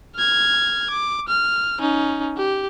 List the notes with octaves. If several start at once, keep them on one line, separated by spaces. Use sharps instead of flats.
F6 G#6
D6
F6
C#4 D#4
G4